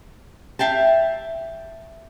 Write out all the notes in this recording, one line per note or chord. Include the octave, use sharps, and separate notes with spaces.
E5 F5 G5 A5